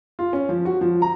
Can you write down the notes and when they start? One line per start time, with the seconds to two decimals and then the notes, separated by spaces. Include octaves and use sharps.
0.19 F4
0.33 C#4
0.49 F3
0.65 F#4
0.81 F3
1.02 A#5